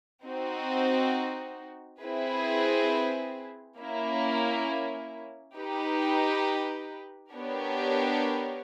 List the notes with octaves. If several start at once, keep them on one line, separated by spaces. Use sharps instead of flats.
C4 D#4 F#4
C4 E4 G#4 B4
A#3 C#4 E4
D#4 G4 B4
B3 D4 G4 A#4 C#5